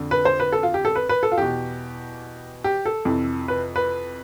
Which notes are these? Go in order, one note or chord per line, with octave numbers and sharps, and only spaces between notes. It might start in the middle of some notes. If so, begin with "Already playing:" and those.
Already playing: F2 D3
B4
C5
B4
A4
F4
G4
A4
B4
B4
A4
F4
E2 B2 G4
G4
A4
F2 C3 E3
B4
B4